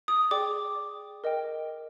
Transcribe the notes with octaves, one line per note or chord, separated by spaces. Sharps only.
D#6
G#4 D5 G5 D6
A#4 D#5 G5